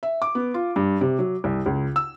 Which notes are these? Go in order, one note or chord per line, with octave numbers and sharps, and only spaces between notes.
E5
D6
B3
F4
G2
C3
F#3
C2
C#2
E6